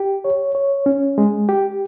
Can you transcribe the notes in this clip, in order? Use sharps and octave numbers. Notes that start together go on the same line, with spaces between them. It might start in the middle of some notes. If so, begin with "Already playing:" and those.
Already playing: G4
C#5
C#5
C#4
G#3
G4